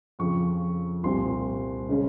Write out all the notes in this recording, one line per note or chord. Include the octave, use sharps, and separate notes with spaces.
F2 C#3 F3 C#6
C2 A#2 G3 C4 C6
C#3 G#3 C#4